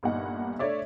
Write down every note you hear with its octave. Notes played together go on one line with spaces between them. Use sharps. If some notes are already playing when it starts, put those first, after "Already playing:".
G1 G2 A#2 D#4 F#5
A3 D4 C#5 D5 E5